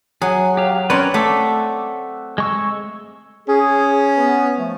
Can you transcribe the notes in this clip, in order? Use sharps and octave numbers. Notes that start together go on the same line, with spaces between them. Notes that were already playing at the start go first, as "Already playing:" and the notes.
F#3 G#4
G4 F5
C4 C#4 A#4 B4 C#5 D5
A3 F#5 D6 E6
G#3 C#6 E6
C#4 G#4
B3
F3 A3